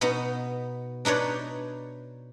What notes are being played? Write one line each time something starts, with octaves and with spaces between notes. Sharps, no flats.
B2 B3 D#4
D4 D#4 B4 C#5 D5